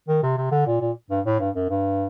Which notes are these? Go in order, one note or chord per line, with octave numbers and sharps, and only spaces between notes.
D#3
C3
C3
D3
A#2
A#2
G2
A2
G2
F#2
G2